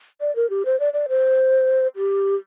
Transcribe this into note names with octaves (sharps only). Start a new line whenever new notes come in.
D5
A#4
G4
C5
D5
D5
C5
G4